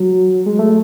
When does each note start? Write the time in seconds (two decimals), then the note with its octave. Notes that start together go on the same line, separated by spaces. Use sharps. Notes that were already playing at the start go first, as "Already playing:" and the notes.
Already playing: F#3
0.46 G#3
0.59 A3